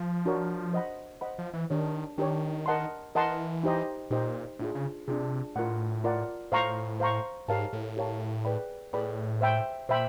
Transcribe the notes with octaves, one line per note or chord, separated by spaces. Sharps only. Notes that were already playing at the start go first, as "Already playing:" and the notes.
Already playing: F3
D4 F#4 A#4 C#5
C5 D#5 F#5 B5
C5 D#5 F#5 B5
F3
E3
D#3 D4 G4 A#4 C#5
D#3 D4 G4 A#4 C#5
A#4 D#5 F#5 A5 C6
E3 A#4 D#5 F#5 A5 C6
D#4 G4 C5 D#5
A#2 D#4 G4 C5 D#5
A2 D4 F4 G#4
C#3
C3 D4 F4 G#4
A2 F4 A#4 D5 F#5
F4 A#4 D5 F#5
A2 C5 F5 A#5 C#6
C5 F5 A#5 C#6
G#2 G4 A#4 C#5 F5 A5
A2
G4 A#4 C#5 F5 A5
G#4 B4 D5 G5 B5
A2 G#4 B4 D5 G5 B5
C5 E5 G5 B5
A#2 C5 E5 G5 B5